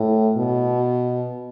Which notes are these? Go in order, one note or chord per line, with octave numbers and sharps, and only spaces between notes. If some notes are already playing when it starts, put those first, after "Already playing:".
Already playing: A2
B2